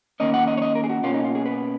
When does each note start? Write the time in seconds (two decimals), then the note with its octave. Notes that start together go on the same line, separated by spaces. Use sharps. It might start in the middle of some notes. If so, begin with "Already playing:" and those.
0.20 D#3 A#3 C#4 D#5
0.34 F#5
0.47 D#5
0.57 C#5
0.62 D#5
0.75 A#4
0.84 G#4
0.89 F#4
1.03 B2 A#3 C#4 F4
1.14 D#4
1.24 F4
1.35 G#4
1.46 B4